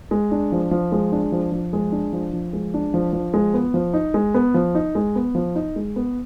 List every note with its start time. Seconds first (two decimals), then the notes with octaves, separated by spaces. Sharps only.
0.11 G#3
0.31 D4
0.52 F3
0.71 F3
0.92 G#3
1.12 D4
1.32 F3
1.52 F3
1.73 G#3
1.92 D4
2.13 F3
2.33 F3
2.53 G#3
2.74 D4
2.94 F3
3.13 F3
3.34 G#3
3.54 B3
3.74 F3
3.93 D#4
4.14 G#3
4.34 B3
4.54 F3
4.75 D#4
4.95 G#3
5.16 B3
5.35 F3
5.55 D#4
5.76 G#3
5.96 B3